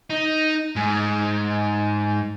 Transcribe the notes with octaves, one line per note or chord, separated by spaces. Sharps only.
D#4
G#2